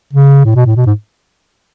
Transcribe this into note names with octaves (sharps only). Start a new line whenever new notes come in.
C#3
A2
B2
A2
B2
G#2